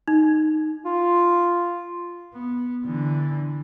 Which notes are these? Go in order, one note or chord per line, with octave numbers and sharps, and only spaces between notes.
D#4
F4
B3
D3 E3